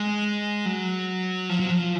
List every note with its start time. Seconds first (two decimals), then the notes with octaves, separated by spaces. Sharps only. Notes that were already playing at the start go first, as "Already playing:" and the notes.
Already playing: G#3
0.65 F#3
1.49 F3
1.60 F#3
1.71 F3